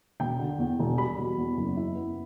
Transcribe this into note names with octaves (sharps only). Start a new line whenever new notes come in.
E1 G5
D3
E2
E1
G3 B5
B2
E2
F#1
E4
B3